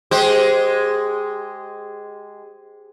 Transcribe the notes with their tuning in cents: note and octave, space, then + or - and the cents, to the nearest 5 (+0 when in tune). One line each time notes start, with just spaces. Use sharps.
G#3 +0 G4 -15 C5 +0